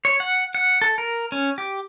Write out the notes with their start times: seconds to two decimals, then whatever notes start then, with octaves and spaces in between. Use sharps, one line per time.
0.05 C#5
0.20 F#5
0.55 F#5
0.82 A4
0.98 A#4
1.32 C#4
1.58 G4